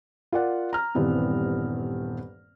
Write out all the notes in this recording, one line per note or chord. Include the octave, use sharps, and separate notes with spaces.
F4 A#4 D5 F#5
A#5 F6
D#1 G2 E3 B3 C4